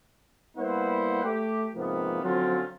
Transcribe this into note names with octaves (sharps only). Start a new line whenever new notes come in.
G3 A#3 B3 E4 C5 F#5
A3 G4
G#2 C3 F3 A#3 B3
D3 F3 F#3 C4 C#4 F4